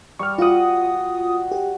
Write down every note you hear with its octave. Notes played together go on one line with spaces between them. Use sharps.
G3 C#6 F6
F4 F#4 F#5 D#6
G4